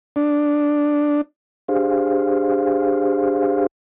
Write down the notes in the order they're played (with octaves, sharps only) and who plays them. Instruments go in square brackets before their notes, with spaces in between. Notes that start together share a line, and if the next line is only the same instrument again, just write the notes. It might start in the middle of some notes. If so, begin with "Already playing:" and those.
[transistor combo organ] D4
[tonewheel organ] D4 G4 G#4 C5 F5